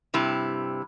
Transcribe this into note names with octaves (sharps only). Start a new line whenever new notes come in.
G2 C3 E4